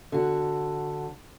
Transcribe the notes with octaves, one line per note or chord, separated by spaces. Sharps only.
D3 F#4